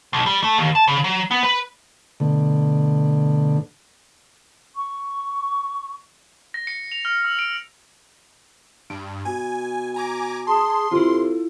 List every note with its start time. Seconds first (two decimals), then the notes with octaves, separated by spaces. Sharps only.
0.13 B1
0.26 G3
0.43 A3
0.58 D#2
0.75 A5
0.87 C#3
1.04 F#3
1.31 B3
1.43 B4
2.20 B2 D3 A3
4.74 C#6
6.54 A#6
6.67 C#7
6.92 F7
7.05 F6
7.25 E6
7.39 D7
8.90 G2 D7
9.25 B2 G#5
9.94 G#5 A#5 D6
10.47 G#4 A5 C6 D#6
10.91 C3 E4 F4 A4